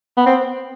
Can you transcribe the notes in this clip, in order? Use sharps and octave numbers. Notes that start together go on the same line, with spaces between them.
B3
C4